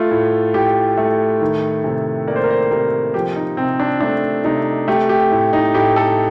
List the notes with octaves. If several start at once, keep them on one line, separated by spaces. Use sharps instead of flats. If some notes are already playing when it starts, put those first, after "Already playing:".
Already playing: A3 F4
A2
A2 G4
A3
D#3
C3
A#3 D5
C5
A#4
C5
C3 A#4
F3 G4
D#4
C3 C4
D4
A3 D4
C3 D#4
A3 G4
G4
A2
D#4
A2 G4
A4